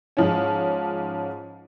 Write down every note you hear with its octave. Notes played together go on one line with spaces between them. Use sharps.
G#2 F3 C#4